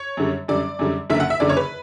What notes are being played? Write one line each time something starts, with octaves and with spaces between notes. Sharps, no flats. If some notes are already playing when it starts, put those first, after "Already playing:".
Already playing: C#5
F#2 D3 G3
F#2 D3 G3 D5
F#2 D3 G3
F#1 F#2 D3 E5
F#5
E5
F#1 F#2 D3 D5
C#5
B4